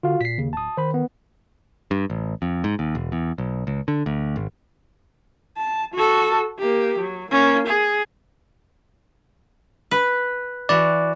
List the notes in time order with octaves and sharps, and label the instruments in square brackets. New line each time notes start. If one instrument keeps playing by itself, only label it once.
[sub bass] D3 [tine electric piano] F4 F#4 F5
[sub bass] A#2 [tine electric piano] B6 C7
[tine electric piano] D#2 [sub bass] C#3
[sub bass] D1 [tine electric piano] A5 D#6
[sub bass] D#3 [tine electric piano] C5 B5
[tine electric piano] B3
[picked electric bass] G2
A1
F2
G#2
D#2
E1
E2
B1
C#2
D3
D2
G#1
[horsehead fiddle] A5
F#4 A4
A#3 G4
F#3
A#3 C#4
G#4
[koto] B4
[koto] E3 F#4 [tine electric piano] D5